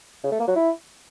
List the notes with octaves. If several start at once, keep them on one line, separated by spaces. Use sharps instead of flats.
C#3
A3
A#3
F#3
E4